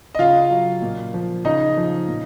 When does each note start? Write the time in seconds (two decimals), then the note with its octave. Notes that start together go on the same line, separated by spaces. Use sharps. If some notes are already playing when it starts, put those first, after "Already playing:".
0.15 D#5
0.19 C#3 F4 F5
0.50 F#3
0.82 A#2
1.14 F3
1.45 C#3 D#4 D#5
1.77 F3
2.08 A#2